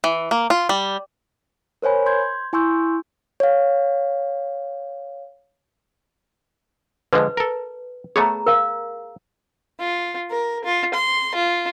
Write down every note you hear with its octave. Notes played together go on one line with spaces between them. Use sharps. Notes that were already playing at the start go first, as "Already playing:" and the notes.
E3
A#3
F4
G3
A#4 C5 C#5 G#5 B5
C6 G6 G#6
E4 G#5 C6 C#6 E6 G6
C#5 F5
D3 F3 G#3 B4
A4 A#4
A3 B3 G#4 C#5 A#5
A#4 F5
F4
A#4
F4
C6
F4